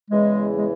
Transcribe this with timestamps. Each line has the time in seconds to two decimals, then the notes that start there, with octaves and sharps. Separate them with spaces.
0.10 E2 C#3 E3 G#3
0.58 G#3